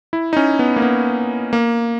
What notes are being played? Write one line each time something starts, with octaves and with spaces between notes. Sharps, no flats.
E4
D#4
C#4
B3
A#3
B3
A#3